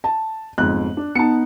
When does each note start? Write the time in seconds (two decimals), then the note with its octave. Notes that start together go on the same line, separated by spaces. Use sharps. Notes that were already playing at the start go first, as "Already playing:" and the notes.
0.04 A5
0.58 G1 F2 G#2 F#6
0.97 D4
1.15 B3 D#4 A5 C#7